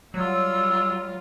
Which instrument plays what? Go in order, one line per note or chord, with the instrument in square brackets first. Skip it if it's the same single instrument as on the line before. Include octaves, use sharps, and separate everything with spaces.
[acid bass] F#3 [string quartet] G3 F4 [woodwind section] E6